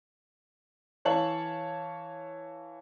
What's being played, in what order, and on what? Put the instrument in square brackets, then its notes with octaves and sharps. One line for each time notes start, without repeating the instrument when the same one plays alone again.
[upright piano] E3 C#5 F5 A5 F#7